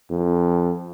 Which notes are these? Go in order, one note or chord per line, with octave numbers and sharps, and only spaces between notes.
F2